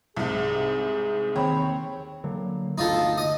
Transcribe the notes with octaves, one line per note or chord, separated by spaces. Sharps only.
C2 G#2 G#4
D#2 C4 C#5 B5
D3 F#3 A#3
G1 D2 D#4 F4 A4
D#5 D#6